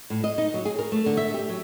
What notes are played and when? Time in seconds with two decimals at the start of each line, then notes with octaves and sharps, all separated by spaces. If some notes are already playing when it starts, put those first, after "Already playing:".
0.10 A2
0.24 D#5
0.38 D#4
0.54 F#3
0.65 G#4
0.79 A#4
0.92 A3
1.06 D3
1.17 E5
1.34 G4
1.49 F#3